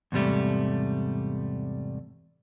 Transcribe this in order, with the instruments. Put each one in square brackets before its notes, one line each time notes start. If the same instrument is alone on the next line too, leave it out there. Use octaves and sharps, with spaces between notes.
[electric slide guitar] E2 G#2 C3 G3 A3